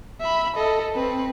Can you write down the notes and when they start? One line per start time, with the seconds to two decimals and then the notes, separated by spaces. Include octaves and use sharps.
0.21 E5 B5
0.57 A4 D#5
0.94 C4 B4